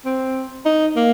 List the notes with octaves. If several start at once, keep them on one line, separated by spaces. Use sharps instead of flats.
C4
D#4
A#3